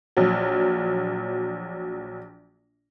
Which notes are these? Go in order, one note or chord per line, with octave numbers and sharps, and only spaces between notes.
A#1 F#3